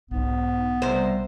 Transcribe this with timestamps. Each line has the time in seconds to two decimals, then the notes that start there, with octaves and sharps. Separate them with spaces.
0.11 B1 G#2 B3
0.82 C3 G3 C5